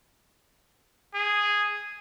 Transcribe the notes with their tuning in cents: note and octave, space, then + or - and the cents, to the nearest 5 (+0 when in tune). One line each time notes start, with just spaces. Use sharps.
G#4 -5